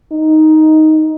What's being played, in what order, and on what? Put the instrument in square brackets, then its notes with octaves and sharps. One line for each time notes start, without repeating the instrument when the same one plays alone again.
[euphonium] D#4